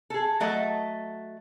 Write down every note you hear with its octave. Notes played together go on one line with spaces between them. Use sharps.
G#4 A4
F#3 A3 D#5